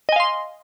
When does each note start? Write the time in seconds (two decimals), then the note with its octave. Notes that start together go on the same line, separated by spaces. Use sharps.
0.09 D#5
0.12 G#5
0.16 F5
0.20 C6